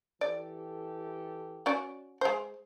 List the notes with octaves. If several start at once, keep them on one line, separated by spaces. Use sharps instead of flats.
E3 G4 A4 D5
C#4 F#4 D5
G#3 C5